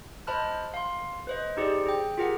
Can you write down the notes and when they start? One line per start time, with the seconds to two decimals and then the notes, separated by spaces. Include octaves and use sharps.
0.27 C5 D#5 A5 B5 F6 F#6
0.74 F5 C6
1.27 B4 C5 D#5
1.57 D#4 G4 G#4 C5 D5
1.86 G#4 G5
2.18 F4 G4 G#4 A#4 F#5